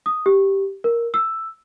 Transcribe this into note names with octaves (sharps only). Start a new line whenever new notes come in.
D#6
G4
A#4
E6